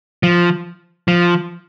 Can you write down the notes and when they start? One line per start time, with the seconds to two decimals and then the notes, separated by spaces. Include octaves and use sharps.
0.23 F3
1.08 F3